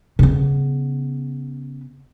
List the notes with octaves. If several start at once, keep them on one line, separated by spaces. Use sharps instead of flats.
C#3 B3